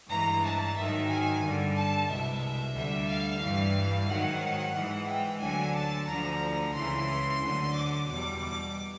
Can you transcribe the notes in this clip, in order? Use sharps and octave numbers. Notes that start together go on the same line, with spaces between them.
G2 E3 G#3 A#5
A5
G#2 D#3 F#3 E5
G#5
G2 D3 G3
A5
C2 B2 G#3 E5
D2 D3 G3 E5
F5
G2 E3 G3
G#2 D#3 F#3 F#5
G#2 E3 G#3
G5
D2 D3 F#3 G#5
A5
D2 D3 F3 A#5
C#2 C#3 E3 C6
D2 D3 F#3
D6
E2 B2 G3 D6
D6